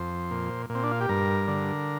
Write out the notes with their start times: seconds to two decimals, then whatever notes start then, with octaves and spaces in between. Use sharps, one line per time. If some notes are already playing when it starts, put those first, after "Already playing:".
Already playing: F2 C5
0.31 A#2
0.70 A#2
0.75 C4
0.83 D4
0.91 F4
1.01 G4
1.09 G2 A#4
1.48 D3